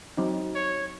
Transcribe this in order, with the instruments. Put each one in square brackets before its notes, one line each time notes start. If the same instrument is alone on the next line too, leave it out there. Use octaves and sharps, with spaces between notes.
[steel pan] F#3 C4 D#4
[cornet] C#5